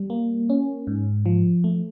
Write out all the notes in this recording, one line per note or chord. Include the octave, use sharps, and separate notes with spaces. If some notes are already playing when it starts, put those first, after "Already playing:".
Already playing: G3
A#3
C#4
G#2
F3
A3